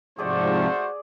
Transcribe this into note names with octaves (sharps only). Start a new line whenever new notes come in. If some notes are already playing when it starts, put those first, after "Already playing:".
G#2 C3 F3 A3 F#4 G#4 C5 D5